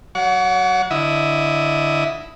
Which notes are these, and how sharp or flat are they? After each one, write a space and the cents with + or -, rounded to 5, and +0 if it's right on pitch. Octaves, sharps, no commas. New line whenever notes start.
F#3 +25 C#5 +40 F#5 -25
D3 +0 E4 +0 D#5 +10